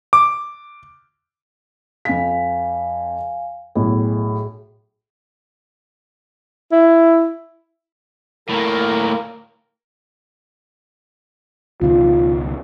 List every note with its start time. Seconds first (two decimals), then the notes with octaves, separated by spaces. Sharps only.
0.13 D6
2.05 F2 F5 G#5 B6
3.75 B1 A2 G#4
6.72 E4
8.50 A2 A#3 A#4
11.81 C#2 B2 D#3 F4